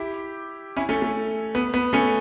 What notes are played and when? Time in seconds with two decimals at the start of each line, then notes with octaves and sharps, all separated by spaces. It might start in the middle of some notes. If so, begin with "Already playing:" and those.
Already playing: E4 G4
0.77 C#4 E4
0.89 A3 C#4
1.02 A3
1.55 B3
1.74 B3
1.93 A3 C#4